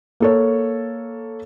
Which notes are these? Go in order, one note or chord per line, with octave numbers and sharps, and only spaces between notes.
A#3 A4 C#5